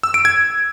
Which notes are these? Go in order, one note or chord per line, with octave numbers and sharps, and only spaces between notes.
E6
D7
G#6